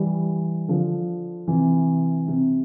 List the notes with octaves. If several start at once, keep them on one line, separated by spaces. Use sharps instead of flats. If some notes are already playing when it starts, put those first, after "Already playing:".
Already playing: E3 G3
D3 F3
C3 E3
C3